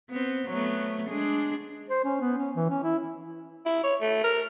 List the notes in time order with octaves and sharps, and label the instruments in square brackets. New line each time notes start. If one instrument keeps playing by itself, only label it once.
[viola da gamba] B3 C4
F#3 A3 B3
G#3 D4 G#4
[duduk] C5
C#4
B3
C#4
E3
C#4
E4
[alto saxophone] E4
C#5
A3
A#4